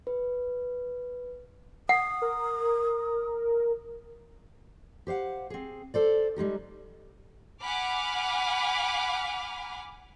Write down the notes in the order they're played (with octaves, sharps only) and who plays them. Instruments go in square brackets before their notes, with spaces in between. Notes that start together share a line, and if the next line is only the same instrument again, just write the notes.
[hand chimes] B4
[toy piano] F#5 [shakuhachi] D#6
[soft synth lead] A#4
[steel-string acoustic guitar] G4 C5 F5 F#5
C4 G#4
A4 C5 D5
G3 G#3 D#4 G4
[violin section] F#5 G#5 B5 D6 F6